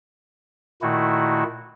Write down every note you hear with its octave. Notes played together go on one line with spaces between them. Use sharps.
A#2 D#3 A3 E4 F#4